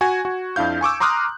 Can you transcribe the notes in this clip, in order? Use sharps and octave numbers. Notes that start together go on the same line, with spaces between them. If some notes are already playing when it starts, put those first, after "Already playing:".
F#4 G#5 G#6
F#4
F2 D4 E4 F5 G6
G#5 C#6 D6 E6
A#5 C6 D6 D#6 F6 F#6